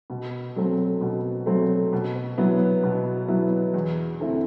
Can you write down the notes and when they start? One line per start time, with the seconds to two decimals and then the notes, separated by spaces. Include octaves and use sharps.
0.10 B2
0.56 F#3 A3 C4
1.01 B2
1.46 F#3 A3 C4
1.93 B2
2.38 F#3 B3 E4
2.84 B2
3.28 F#3 B3 E4
3.74 E2
4.20 D3 A3 C4 E4